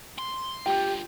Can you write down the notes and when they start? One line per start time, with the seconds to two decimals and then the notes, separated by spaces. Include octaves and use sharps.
0.18 C6
0.66 D3 F4 G4 G5 G6